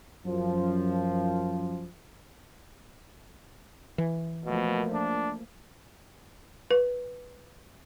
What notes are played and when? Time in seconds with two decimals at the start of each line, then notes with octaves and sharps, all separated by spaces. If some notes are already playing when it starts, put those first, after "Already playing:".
0.26 F#2 F3
3.98 E3
4.46 B2 F3 A3 A#3
4.93 D4
6.71 B4